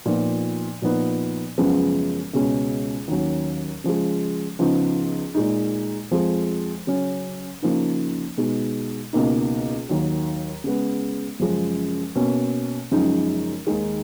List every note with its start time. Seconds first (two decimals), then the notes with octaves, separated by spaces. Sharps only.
0.06 A#2 F3 B3 D#4
0.82 A#2 F3 B3 D#4
1.58 F#2 C#3 F3 G#3 B3
2.33 C#2 B2 G#3 C#4
3.08 D#2 D#3 F#3 C#4
3.84 C#3 F3 G#3
4.59 C#2 C#3 F3 B3 D#4
5.35 A#2 G#3 D#4
6.11 F2 F3 G#3
6.87 C#3 F#3 C#4
7.62 C#3 F3 A#3 D#4
8.37 B2 G#3 D#4
9.13 C#2 B2 A#3 D#4
9.89 D#2 D#3 F#3
10.64 C#3 G#3 B3
11.39 F#2 C#3 F3 G#3
12.15 B2 A#3 C#4
12.91 F#2 C#3 F3 G#3 D#4
13.67 D#2 D#3 G#3 D#4